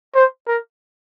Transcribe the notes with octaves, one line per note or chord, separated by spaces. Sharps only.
C5
A#4